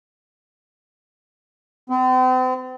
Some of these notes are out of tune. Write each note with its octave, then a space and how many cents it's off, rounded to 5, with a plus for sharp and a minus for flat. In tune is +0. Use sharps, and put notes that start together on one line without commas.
C4 -40